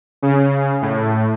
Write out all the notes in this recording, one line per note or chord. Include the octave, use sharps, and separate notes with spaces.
C#3
A2